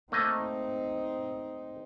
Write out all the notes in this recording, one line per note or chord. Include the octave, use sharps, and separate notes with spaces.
A3 A#3 C4 D#4 D#5